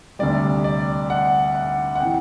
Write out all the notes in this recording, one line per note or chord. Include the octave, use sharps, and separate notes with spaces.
D2 C3 G3 D5
D5
F#5
F#5
F#5
C3 E3 G5